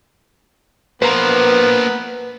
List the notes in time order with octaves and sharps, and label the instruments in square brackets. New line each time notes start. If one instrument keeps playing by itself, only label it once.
[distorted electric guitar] A#3 C5 [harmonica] B3 [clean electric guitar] B4 A#5